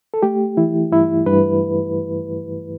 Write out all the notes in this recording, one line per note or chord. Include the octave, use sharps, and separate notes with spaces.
A4
A3 G4
E3 E4
G2 E4
G2 B4